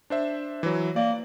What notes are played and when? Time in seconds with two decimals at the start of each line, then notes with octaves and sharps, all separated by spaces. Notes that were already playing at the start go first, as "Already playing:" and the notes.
0.10 D4 C5 E5
0.63 E3 F#3
0.96 A#3 D5